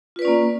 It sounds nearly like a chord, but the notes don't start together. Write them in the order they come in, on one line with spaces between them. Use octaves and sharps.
F4 B4 D5 C#4 A#3